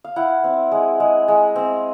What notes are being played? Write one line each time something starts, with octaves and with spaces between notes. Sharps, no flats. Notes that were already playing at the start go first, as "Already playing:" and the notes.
F5
E4 F#5
C4
G#3
G#3
G#3
C4